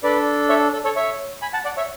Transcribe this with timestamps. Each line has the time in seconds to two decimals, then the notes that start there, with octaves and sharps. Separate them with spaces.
0.03 D4 A4 B4 D5
0.49 C#5 E5
0.73 A4
0.84 A4 C#5
0.96 C#5 E5
1.42 G#5 B5
1.53 F#5 A5
1.65 D5 F#5
1.77 C#5 E5